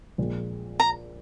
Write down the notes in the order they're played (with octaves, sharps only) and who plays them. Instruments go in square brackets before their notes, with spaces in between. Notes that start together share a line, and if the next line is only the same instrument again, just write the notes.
[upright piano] A#1 A#2 G#3
[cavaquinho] A#5